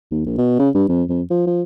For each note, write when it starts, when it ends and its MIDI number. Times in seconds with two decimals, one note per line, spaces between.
0.11 0.24 39
0.26 0.34 34
0.38 0.57 47
0.59 0.69 49
0.75 0.85 43
0.89 1.03 41
1.09 1.22 41
1.31 1.46 53
1.47 1.62 53